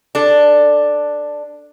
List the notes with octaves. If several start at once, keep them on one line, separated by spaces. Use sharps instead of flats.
D4 A4